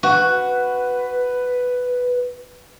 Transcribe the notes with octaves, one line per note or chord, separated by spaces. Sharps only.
F#4 B4